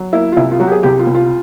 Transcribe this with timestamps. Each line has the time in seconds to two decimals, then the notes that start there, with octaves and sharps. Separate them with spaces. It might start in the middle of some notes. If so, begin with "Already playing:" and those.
Already playing: F#3
0.13 A#3 E4
0.32 F4
0.36 C2 E4
0.51 F4
0.60 F#3 F#4
0.67 G4
0.72 G#4
0.83 C2 G4
0.99 F4
1.07 C2
1.15 F4